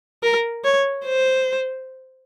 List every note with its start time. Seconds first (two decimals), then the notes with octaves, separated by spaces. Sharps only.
0.23 A#4
0.64 C#5
1.05 C5